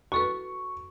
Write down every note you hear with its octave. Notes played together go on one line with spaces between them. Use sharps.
F#4 A4 B4 C#6